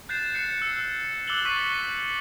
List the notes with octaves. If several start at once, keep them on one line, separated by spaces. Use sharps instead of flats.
F#6 G6 A6 C7 E7
F#6 A6 C7 C#7
E6 C#7
D6 E6 F#6 A6 F#7 G7
C#6 A6 B6 C#7 D#7
B6 F#7